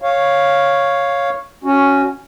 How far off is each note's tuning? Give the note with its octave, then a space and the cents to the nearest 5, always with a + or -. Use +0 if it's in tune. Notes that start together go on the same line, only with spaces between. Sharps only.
C#5 +0 F5 +0
C#4 +0 F#4 +0